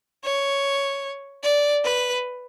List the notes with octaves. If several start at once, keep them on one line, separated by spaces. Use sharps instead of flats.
C#5
D5
B4